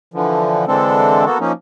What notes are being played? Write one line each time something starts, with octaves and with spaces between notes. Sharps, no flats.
D3 E3 F3
D3 E3 G#3 C4 D4 A4
A#3 B3 F#4 A4
F3 A#3 C#4 D#4